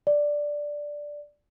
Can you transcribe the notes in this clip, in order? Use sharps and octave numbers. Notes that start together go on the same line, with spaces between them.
D5